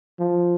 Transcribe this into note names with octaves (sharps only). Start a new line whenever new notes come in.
F3